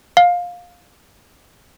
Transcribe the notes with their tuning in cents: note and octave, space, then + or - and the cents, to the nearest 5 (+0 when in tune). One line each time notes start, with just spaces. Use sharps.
F5 +20